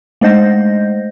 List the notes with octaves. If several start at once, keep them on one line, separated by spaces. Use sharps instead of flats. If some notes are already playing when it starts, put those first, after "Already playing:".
G#3 A3 C5 D#5 G6 A#6